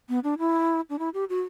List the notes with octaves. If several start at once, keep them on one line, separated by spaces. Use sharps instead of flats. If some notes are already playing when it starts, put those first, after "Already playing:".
B3
D4
E4
D4
E4
G4
F#4